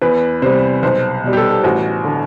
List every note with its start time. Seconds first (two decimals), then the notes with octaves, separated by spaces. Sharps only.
0.02 E2 B4
0.42 C3 G3 C5
0.83 B1 C5
1.24 B2 G3
1.33 G4
1.37 A4
1.64 A1 F#4
2.05 D3